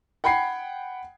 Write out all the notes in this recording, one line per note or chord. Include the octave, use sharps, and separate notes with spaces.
F#5 G5 B5 G#6 C7